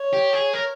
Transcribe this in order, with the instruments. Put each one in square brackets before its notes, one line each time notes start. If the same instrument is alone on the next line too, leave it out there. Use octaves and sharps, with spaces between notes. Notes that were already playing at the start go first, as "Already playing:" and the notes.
Already playing: [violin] C#5
[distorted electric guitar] G4
G#4
A#4